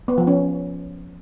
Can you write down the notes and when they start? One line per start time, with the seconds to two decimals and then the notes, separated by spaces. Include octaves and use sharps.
0.08 B3
0.18 F3
0.27 C#4